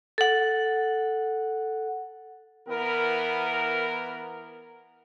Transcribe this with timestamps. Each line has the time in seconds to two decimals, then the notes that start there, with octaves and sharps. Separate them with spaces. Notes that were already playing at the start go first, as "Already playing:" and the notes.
0.18 A4 F#5
2.68 E3 B3 A#4